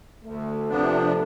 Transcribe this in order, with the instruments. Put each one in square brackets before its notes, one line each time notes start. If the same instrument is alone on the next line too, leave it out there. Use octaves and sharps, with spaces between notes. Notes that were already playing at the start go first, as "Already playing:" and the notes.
[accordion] D2 [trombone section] A3
[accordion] C3 F3 B3 D4